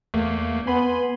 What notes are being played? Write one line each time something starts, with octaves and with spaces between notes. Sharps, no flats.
E2 A3 A#3
B3 G#5 B5 C6